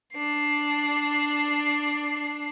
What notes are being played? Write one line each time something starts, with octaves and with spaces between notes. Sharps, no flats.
D4 C7